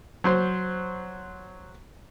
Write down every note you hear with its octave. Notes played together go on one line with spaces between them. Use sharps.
F#3 C5 C6